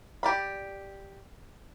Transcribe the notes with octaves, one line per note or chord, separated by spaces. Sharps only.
G4 D5 B5